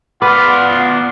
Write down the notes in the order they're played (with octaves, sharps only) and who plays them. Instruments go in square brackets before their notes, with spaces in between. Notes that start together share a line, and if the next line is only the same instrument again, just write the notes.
[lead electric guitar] B3 D5 [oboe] F4 [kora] B4 [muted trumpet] F#5